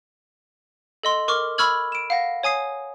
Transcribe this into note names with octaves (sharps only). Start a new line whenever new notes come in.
A4 D#5 C6
A#4 C#6 D6 F6
B5 C#6 E6 F6 G#6 F#7
D7 E7
F5 F#5 A#6
C#5 G#5 D#6 C7